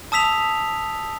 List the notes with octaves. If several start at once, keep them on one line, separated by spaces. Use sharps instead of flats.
A5 D#6 E6 B6 F7